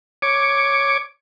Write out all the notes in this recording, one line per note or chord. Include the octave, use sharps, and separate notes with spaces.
C#5 D6